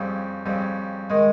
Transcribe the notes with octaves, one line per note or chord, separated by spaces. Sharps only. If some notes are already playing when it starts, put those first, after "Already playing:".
Already playing: F2 C#3 G3
F2 C#3 G3
D#3 G#3